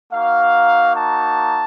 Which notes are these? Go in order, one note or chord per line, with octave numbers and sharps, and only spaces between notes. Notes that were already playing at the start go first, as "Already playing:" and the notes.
A#3 D#4 F#4 F5
A5